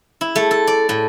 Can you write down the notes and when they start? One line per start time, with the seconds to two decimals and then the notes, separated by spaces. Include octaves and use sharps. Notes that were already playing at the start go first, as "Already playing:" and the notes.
0.21 E4
0.36 A3
0.51 A4
0.67 D5
0.89 A2